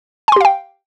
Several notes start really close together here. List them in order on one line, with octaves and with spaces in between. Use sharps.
G#5 C6 G4 F5 G5